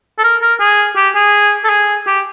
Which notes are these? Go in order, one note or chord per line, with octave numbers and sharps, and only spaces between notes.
A4
A#4
A#4
G#4
G4
G#4
A4
G#4
G4